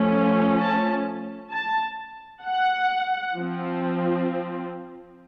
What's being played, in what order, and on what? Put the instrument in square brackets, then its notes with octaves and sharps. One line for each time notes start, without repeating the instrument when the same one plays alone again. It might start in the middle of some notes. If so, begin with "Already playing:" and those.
Already playing: [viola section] F3 A3 C#4
A5
A5
F#5
F3 C4